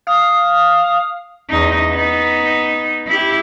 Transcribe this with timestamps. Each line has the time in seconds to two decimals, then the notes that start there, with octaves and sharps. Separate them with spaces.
0.07 F5 D#6
1.49 E2 D#4
1.91 B3 D#4
3.07 E4 G4